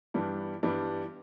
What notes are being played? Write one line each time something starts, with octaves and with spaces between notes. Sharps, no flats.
G2 E3 G3 B3 D4
G2 E3 G3 B3 D4